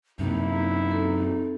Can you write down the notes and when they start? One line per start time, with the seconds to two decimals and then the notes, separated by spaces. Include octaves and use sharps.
0.19 F#2 C3 A#3 D#4 E4
0.89 C4 A4